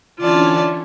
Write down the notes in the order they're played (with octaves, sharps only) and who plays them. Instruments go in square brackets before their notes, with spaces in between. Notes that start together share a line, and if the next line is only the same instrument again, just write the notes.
[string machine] D3 E3 C#4 [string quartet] F4 D5 A5